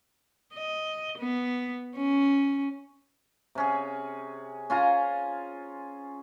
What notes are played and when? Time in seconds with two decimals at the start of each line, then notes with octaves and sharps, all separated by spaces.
0.54 D#5
1.18 B3
1.97 C#4
3.55 C3 C#4 G#4
4.70 C#4 F4 G#5 A#5